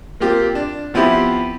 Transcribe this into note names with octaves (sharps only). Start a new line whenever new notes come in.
A#3 C4 F4 G4
D4
F3 B3 C4 E4 G4